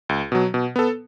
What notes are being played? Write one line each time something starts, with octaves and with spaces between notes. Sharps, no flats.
C#2
B2 F#3
B2
B3 A4